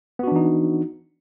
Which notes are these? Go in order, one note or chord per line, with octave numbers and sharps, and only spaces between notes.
E3 B3 D4 D#4 F#4